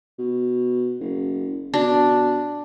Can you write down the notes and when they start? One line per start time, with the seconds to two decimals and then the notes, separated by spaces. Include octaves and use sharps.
0.19 B2
1.00 F#1
1.74 B2 D4